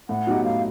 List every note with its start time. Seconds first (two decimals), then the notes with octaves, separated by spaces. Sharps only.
0.09 A2 F#5
0.27 F#3 B3 D#4 G4
0.44 A2 F5